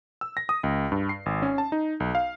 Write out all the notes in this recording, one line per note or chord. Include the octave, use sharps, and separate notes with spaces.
E6
A#6
D#6
C#2
G2
C7
G#1
C#4
A5
D#4
B1
F5